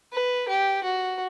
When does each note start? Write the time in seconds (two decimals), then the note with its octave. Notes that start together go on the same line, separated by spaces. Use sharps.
0.13 B4
0.48 G4
0.83 F#4